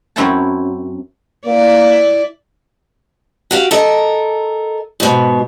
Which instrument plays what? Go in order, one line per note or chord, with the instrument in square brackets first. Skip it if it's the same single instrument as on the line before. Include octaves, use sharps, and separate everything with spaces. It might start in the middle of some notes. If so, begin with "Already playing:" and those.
[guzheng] F#2 C4 E4 C#5 F#5 A5
[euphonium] A#3 [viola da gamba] E4 D5
[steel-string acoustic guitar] F#4 G4 F5
A4 A#4 D#5
G#2 B2